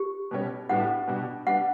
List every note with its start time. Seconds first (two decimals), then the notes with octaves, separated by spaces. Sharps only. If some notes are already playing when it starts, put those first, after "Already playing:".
Already playing: G4
0.31 B2 G3 C#4
0.69 A2 G3 B3 D4 F#4 F#5
1.07 B2 G3 D4 F#4
1.47 G3 B3 D4 F#5